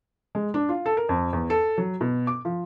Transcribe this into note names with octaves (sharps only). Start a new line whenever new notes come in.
G#3
D4
F4
A4
A#4
F2
E2
A4
F#3
B2
D6
F3